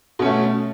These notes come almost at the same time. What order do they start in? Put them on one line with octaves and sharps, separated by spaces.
B2 C#4 A3